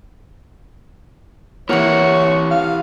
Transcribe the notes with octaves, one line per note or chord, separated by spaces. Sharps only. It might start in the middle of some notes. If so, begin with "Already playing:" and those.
E3 A#3 E4 G4 C#5 F#5
F5